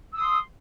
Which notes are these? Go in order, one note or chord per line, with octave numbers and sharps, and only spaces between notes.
C6 D#6 E6